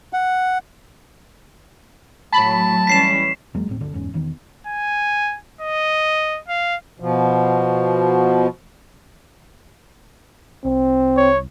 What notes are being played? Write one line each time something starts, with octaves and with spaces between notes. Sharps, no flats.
F#5
A2 F#3 A5 B5
E3 G3 C#4 B6 C7 E7
E2 F#3 G#3 A#3
D1 G1 A2 C4
D1 G1 D3 D4
F#1 E2 G#2 C#4
E1 D#3 B3
G#5
D#5
F5
B2 F3
C2 C4
C#5